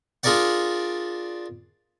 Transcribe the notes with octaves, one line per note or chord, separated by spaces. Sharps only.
D4 F4 G#4 A#4 D5 F#5